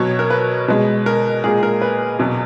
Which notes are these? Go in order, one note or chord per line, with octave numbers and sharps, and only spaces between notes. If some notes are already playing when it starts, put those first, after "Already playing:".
Already playing: B2 F#3 C#5
A#4
B4
B2 G#3
A#4
A#2 G#3 G#4
A#4
B4
E2 B2 F#3